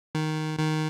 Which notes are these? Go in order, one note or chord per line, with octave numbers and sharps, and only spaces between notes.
D#3
D#3